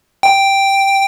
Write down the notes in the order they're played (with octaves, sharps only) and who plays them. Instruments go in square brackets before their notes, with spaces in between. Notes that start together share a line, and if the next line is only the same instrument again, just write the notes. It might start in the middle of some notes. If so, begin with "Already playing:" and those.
[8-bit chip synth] G5